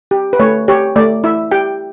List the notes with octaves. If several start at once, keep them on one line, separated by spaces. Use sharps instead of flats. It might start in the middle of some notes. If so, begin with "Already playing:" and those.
G4
B4
A3 C#5
G4 C#5
A3 D5
E4 E5
G4 G5